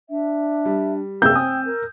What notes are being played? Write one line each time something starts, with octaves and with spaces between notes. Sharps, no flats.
D4 E5
G3
F#2 C3 A#3 G#4 G5 E6 G6
C4 G#5 D#6
A#4